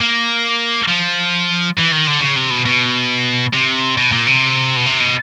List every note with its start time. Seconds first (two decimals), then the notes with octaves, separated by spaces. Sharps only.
0.01 A#3
0.89 F3
1.77 E3
1.92 D#3
2.07 D3
2.21 C#3
2.36 C3
2.51 B2
2.65 B2
3.53 C3
3.97 B2
4.12 A#2
4.27 C3
4.76 B2
4.86 C3
5.00 B2